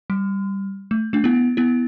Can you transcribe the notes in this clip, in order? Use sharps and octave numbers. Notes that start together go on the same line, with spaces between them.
G3
A3
A3 D4
B3 E4
B3 E4